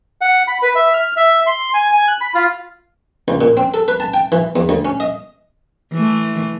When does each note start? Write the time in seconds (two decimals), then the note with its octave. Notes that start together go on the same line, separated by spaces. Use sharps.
0.21 F#5
0.48 B5
0.62 B4
0.75 E5
0.93 F6
1.17 E5
1.47 C6
1.74 G#5
1.91 G#5
2.08 F#6
2.21 B5
2.35 F4
3.28 C#2
3.41 A#2
3.57 C4
3.74 A4
3.88 B4
4.00 A5
4.14 G5
4.32 E3
4.56 E2
4.69 D2
4.85 C#4
5.00 D#5
5.93 E3 A3